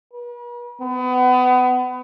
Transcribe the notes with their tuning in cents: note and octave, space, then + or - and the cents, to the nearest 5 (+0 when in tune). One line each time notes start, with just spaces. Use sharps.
B4 -45
B3 +30